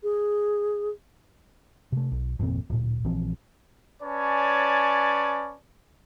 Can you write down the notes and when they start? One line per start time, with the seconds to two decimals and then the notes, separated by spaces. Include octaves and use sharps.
0.03 G#4
1.92 C3 A3
2.11 B1
2.39 G1 E2 A#2 C4
2.70 D1 A#2
3.04 A#1 E3 F3 C4
4.03 C#4 B4 C#5 D5 G#5 A5